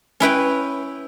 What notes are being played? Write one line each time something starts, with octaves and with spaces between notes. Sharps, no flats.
C#4 E4 B4 G5